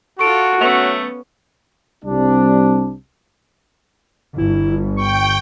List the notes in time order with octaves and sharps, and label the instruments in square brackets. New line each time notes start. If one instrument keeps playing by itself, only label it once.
[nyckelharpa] F4 A4 [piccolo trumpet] F#4 [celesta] C#6 D7
[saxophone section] F#3 A3 [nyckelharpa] B3 C#4
[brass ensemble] C2 G3 C4 D4
[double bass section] G1 [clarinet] E4
[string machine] G5 [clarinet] C#6